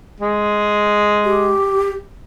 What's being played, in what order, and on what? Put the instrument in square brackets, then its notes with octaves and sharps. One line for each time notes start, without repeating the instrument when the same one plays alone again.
[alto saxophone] G#3
[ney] G4